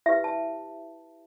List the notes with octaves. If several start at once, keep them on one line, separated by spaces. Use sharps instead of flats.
E4 G4 B4 E5
A5